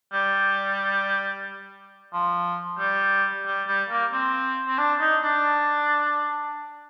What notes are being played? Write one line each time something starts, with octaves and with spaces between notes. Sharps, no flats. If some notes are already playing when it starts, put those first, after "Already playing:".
G3
F3
G3
G3
G3
A#3
C4
C4
D4
D#4
D4